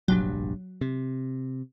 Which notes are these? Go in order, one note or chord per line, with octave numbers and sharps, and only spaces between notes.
F1 A#1 G2 F#3
C3